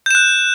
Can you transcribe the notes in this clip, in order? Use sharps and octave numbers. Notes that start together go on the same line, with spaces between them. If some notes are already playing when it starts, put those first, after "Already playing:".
F#6 G6 E7